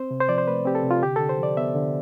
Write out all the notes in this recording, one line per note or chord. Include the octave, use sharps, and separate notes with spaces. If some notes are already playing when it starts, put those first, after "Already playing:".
Already playing: C4 C5
C3
C5
F3 D5
C5
A3 B4
C4 G4
A4
C3
F4
D3 G4
D3 A4
C5
F3
D5
B3 E5
D3